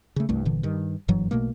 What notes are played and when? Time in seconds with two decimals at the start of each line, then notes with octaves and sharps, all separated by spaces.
0.16 C#3 A3
0.29 C2 G2 A3
0.45 G1 A#2 D3 E3
0.63 G2 D#3
1.08 F#1 G2 E3 F#3
1.31 B1 B2 A3 A#3